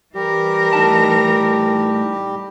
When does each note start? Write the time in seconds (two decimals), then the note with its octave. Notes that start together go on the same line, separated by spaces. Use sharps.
0.15 E3 G3 G4 A#4
0.73 A2 D#4 A5